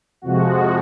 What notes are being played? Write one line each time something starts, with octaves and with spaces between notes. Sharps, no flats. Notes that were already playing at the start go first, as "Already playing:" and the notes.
F2 C3 F3 G#3 F#4